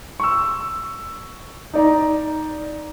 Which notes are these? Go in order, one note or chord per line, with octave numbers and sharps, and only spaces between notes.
C#6 E6
D#4 D5 A#5